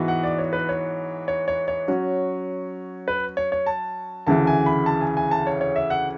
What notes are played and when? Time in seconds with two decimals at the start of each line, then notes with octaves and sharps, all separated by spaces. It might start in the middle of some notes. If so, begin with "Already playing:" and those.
Already playing: G#2 E3 B3 F#4
0.08 F#5
0.23 D5
0.38 C#5
0.53 B4
0.69 C#5
1.28 C#5
1.48 C#5
1.68 C#5
1.88 F#3 C#4 F#4
3.08 B4
3.37 C#5
3.52 C#5
3.66 A5
4.27 D2 C#3 E3 A5
4.47 G#5
4.66 B5
4.86 A5
5.01 G#5
5.17 G#5
5.31 A5
5.47 C#5
5.61 C#5
5.76 E5
5.90 F#5